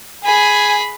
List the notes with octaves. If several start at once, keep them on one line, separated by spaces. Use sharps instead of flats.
G#4 G#5 B5